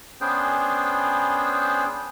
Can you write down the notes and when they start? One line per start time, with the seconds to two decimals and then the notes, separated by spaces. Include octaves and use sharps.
0.21 B3 C#4 D4 G#4 C5 G5